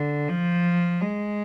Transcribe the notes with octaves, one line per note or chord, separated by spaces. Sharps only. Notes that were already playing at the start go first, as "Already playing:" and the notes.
Already playing: D3
F3
G#3